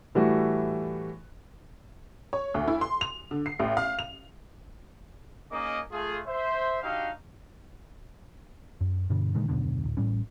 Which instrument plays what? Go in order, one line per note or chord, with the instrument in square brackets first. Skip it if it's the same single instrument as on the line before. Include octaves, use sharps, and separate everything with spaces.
[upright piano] A2 E3 G3 A3 F#4
[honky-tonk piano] C#5
D2
E4
C6
F7
D3
C7
A1
F5
F7
[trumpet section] A#3 C#4 D#4 G#4 D#5 D6
A3 F4 G#4
C5 E5
D4 D#4 F#4 G4 F5
[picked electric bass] F#2
G2 B2 D3 G3
A#2 D3 D#3 G#3
D#1 F#2 B2 D3
D1
A1 A2 G3 C#4